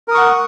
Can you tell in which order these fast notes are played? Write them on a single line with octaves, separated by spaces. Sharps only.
A#4 D#6 C#6 F#5